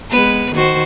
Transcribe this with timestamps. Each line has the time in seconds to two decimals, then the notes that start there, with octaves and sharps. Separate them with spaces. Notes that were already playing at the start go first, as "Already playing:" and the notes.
0.10 G#3 B3 B4
0.53 D#3 F#4 C5